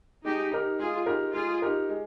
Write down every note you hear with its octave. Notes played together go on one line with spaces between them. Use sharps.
G#3 D#4 G4
D#4 G4 A#4
G#3 F4 G#4
D#4 G4 A#4
G#3 F4 G#4
D#4 G4 A#4
G#3